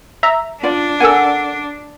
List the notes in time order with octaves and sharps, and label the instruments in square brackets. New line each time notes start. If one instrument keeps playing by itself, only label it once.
[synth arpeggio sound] E5 A#5 E6
[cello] D4 [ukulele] F4 D5
[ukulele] A4 A#4 F#5 [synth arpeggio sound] G#5 E6